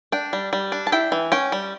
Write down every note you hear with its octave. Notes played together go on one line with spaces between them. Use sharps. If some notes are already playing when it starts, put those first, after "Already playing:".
D4 G5
G3
G3
D4
A5
E4 G5
E3
C#4 G5
G3